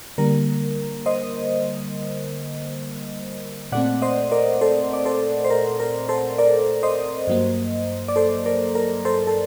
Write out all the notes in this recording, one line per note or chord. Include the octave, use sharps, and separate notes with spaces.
D3 G3 A#3 A#4
C5 D#5
A#2 A3 C4 D5 F#5
C5 D#5
A#4 D5
A4 C5
D5
A4 C5
C5
A#4
A#4
A4 C5
A#4 D5
C5 D#5
G2 F#3 A#3
D5
A4 C5
A#4 D5
A#4
A4 C5
A4